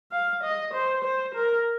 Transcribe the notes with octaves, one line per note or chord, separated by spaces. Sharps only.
F5
D#5
C5
C5
A#4